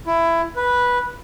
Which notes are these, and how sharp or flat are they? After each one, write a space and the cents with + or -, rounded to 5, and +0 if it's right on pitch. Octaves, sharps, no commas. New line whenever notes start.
E4 +15
B4 -10